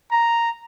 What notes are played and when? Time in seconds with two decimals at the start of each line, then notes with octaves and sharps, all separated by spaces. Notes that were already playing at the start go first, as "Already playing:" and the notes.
0.12 A#5